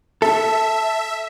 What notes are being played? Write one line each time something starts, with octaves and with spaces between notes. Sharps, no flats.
A4 E5